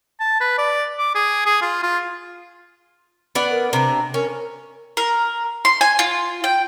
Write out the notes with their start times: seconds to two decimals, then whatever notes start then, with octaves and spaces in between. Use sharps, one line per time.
0.20 A5
0.40 B4
0.58 D5
0.99 D6
1.15 G#4
1.46 G#4
1.62 F4
1.83 F4
3.35 B3 D5 F#5
3.51 A#4
3.73 C3 D4 A#5
4.14 C#4 A#4
4.97 A#4
5.65 C6
5.81 G#5
5.99 F4
6.44 G5